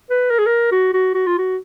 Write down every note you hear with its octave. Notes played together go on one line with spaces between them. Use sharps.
B4
A#4
G#4
A#4
F#4
F#4
F#4
F4
F#4